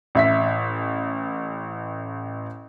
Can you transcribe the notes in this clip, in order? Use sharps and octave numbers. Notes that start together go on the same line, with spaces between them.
A1 E5 B6